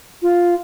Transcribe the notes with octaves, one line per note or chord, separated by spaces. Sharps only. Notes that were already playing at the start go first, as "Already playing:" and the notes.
F4